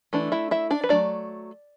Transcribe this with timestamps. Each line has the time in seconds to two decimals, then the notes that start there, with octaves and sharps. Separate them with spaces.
0.13 E3 A3 D4
0.32 E4 E5
0.51 E4 E5
0.71 D4 D5
0.84 B4
0.89 F#3 A3 D4 D5